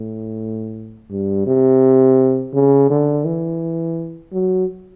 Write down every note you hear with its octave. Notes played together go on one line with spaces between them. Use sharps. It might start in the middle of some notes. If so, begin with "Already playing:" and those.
Already playing: A2
G2
C3
C#3
D3
E3
F#3